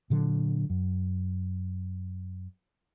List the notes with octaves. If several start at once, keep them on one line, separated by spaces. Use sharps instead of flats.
A#2 D3 F#3
F#2